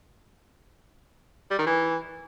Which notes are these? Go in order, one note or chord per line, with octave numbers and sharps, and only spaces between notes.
G3
D#3
E3